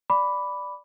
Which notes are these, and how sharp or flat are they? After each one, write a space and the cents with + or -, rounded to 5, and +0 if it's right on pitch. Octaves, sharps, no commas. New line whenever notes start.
D5 +0 B5 +0 D6 -10